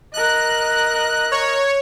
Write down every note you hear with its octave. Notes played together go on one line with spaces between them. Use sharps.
A#4 D#5 F#6
C#5